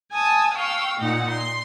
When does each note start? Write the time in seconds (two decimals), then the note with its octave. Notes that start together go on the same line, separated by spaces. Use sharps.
0.12 G#5 A5 D#6 E6
0.54 F5 G5 C#6 E6
0.98 A#2 D#4 F#5
1.30 C6